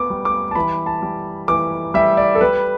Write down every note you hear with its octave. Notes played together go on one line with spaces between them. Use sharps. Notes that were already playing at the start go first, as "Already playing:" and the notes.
Already playing: B3 D6
G3
D6
A5
E3 B5
A5
G3
E3 D6
G3 E5
D5
A4
G3 B4